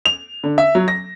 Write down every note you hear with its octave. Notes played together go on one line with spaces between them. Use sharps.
F7
D3
E5
F#3
A#6